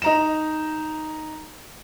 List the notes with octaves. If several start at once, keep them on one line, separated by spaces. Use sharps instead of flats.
D#4 A#5 E7